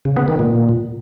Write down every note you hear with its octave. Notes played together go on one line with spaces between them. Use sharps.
C#3
B3
D#3
A#2